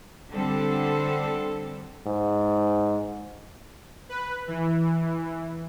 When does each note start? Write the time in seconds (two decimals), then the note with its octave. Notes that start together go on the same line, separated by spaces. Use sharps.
0.30 D3 G3 C4 A4
2.07 G#2
4.09 B4
4.48 E3